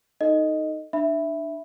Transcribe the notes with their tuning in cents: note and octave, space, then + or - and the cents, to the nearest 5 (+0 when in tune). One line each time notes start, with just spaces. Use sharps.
D#4 +0 A4 +0 D#5 +0
D4 +25 E5 +0 B5 +0